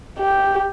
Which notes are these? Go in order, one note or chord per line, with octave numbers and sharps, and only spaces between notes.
G4